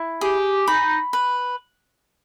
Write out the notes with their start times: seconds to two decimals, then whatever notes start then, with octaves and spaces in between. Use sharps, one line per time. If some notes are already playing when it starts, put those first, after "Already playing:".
Already playing: E4
0.21 G4 G#4
0.67 D#4 B5
1.13 B4